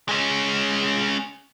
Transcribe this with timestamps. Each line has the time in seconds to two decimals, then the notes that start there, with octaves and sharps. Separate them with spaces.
0.09 G#3 C#4